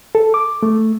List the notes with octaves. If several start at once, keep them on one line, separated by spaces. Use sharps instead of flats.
A4
D6
A3